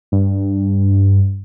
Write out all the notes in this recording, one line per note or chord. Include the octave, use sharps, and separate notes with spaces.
G2